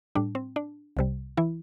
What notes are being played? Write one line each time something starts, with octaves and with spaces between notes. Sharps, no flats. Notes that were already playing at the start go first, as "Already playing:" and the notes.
A2 G3 D4
C4
D4
C2 C3 G3
E3 E4